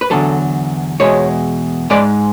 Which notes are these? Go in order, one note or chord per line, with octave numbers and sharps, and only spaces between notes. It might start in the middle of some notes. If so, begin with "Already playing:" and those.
B4
E2 D3 F#3 A4
E2 B2 G#3 C#5
G#2 G#3 D5